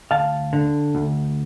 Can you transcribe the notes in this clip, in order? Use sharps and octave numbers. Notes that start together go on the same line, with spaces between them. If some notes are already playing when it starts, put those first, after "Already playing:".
D2 F5 A5
D3
D2